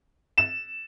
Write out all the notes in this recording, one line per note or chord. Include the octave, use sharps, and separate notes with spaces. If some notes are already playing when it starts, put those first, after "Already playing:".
E7